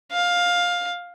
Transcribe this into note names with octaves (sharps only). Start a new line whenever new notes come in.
F5